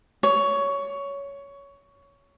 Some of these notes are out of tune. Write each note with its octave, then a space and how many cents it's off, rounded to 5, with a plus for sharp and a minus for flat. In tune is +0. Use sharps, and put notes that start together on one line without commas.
C#5 +15